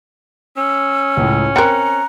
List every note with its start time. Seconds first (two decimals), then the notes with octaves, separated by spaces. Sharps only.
0.57 C#4 E6
1.17 C#2 A2
1.56 C4 A#4 A#5 F#6 C#7